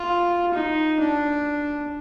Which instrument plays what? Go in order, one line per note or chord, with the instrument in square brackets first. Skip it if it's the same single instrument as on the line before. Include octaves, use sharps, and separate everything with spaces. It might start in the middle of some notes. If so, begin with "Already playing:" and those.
Already playing: [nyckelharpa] F4
D#4
D4